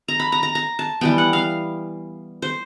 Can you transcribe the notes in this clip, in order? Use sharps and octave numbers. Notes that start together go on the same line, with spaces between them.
A#5
B5
A#5
A#5
A#5
A5
E3 G3 B3 G5
F#5
F5
C5